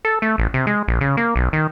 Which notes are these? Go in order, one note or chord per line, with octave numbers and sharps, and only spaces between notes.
A4
A3
A1
C3
G#3
A#1
C#3
A#3
B1
D#3